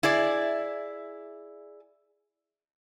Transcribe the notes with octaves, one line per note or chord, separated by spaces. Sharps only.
E4 G#4 D5